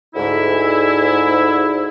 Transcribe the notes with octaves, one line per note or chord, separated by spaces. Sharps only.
D2 G#2 E4